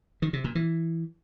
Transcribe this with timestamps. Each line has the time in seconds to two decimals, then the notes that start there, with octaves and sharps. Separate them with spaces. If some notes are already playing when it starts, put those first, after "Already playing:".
0.22 D#3
0.33 C3
0.44 A#2
0.55 E3